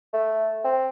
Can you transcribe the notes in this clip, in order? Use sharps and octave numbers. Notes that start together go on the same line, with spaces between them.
A3
C4